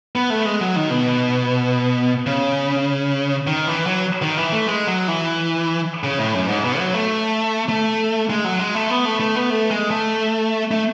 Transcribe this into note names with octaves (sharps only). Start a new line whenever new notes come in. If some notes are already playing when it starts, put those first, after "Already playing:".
B3
A3
G#3
F#3
D#3
B2
C#3
D#3
E3
F#3
D#3
E3
A3
G#3
F#3
E3
C#3
A2
F#2
G#2
B2
F#3
A3
A3
G#3
F#3
G#3
A3
B3
A3
A3
B3
A3
G#3
A3
A3